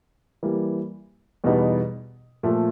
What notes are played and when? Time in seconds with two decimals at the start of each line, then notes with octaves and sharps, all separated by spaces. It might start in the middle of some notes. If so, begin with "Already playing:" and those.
0.43 E3 G3 A#3
1.44 E2 B2 G3 B3 D#4
2.43 A#2 F3 A3